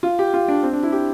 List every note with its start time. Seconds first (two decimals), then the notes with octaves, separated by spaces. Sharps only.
0.03 F4
0.19 G4
0.34 F4
0.48 D4
0.63 C4
0.73 D4
0.83 E4
0.92 G4